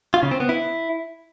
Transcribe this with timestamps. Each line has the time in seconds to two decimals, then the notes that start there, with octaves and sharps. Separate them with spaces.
0.14 F4
0.23 C#3
0.31 C4
0.40 B3
0.49 E4